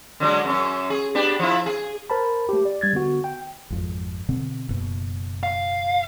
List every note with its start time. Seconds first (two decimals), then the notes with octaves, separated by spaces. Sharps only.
0.20 D3 F#3 G#3
0.45 F#2 C#4
0.90 G#4
1.15 B3 D4 G4
1.39 F3 E4
1.66 G#4
2.10 A#4 C5 A5 B5
2.49 A3 G4
2.65 D5
2.81 G3 G#6 A6
2.93 D3 B3 F#4
3.24 G5
3.70 G#1 F2
4.29 B2 D3 C4
4.69 F#1 B2
5.43 F5